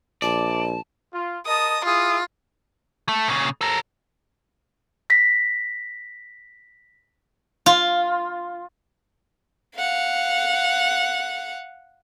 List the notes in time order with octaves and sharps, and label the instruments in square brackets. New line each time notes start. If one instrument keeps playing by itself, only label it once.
[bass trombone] A#1 [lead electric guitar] D5 [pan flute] A5
[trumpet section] F4
[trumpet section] A#4 D#5 A5 [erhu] D#6
[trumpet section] E4 G#4 D#6 [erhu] F4
[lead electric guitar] A3
A#2 C#3
A4 A#4
[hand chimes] A#6 B6
[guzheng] F4
[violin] F5 F#5